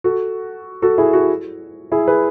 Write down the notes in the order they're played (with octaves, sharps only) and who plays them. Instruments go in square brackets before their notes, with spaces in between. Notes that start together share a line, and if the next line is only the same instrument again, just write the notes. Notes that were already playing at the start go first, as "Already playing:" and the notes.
[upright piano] F#4 A4
F#4 A4
E4 G#4
F#4 A4
E4 G#4
G#4 B4